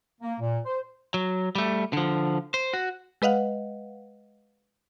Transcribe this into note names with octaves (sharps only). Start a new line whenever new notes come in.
A#3
A#2
C5
F#3
G3 A3
D3 F3
C5
F#4
G#3 B4 D#5 F5 F#5